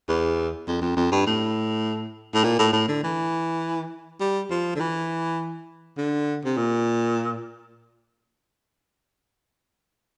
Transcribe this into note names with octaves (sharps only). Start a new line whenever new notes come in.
E2
F2
F2
F2
G2
A2
A2
A#2
A2
A2
D3
E3
G3
F3
D3
E3
D3
C3
A#2